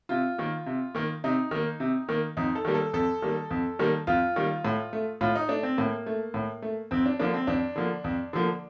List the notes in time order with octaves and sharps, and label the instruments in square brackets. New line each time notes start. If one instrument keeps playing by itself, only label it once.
[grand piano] C3 F4
D#3 A#3
C3
D#3 A#3
C3 D#4
D#3 A#3
C3
D#3 A#3
F2 D#4
A4
D#3 G3 A#3
A4
F2 A4
D#3 G3 A#3
F2
D#3 G3 A#3
F2 F4
D#3 G3 A#3
A2
A3
A2 F4
D#4
A3 D4
C4
A2 A#3
A3
A2
A3
F2 C4
D4
D3 F3 A#3 D4
C4
F2 D4
D3 F3 A#3
F2
D3 F3 A#3